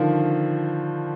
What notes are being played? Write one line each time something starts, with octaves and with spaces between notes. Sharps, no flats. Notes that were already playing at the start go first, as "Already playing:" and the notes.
Already playing: D3 D#3 F3